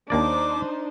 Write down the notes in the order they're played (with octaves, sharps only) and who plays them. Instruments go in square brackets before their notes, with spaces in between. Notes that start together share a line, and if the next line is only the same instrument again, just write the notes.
[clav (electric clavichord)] D#2 A#3 D5 [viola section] D4 D#4 C5 [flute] D6